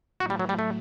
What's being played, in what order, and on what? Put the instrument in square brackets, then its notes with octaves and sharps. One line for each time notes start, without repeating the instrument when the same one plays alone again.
[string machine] A2 F#3 A3 [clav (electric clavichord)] F#4
[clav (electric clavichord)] G3
F#3
G3
A3